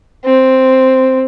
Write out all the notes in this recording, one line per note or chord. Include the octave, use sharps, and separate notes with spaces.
C4